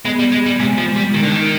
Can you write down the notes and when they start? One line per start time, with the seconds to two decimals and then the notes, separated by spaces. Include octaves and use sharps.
0.05 G#3 B3
0.19 G3
0.32 G#3
0.46 G3
0.59 C3 G#3
0.78 F3
0.96 G3
1.14 D#3
1.23 D3
1.30 D#3